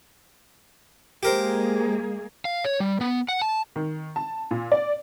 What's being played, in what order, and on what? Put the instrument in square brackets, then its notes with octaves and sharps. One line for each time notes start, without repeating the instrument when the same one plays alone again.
[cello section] G#3 A#3 G#4 [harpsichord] G4 A#4 C5
[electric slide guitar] F5
C#5
G3
B3
F#5
A5
[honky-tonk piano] D#3
A5
A#2
D5